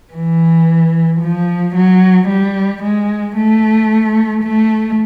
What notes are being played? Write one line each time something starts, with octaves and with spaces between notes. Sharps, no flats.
E3
F3
F#3
G3
G#3
A3
A3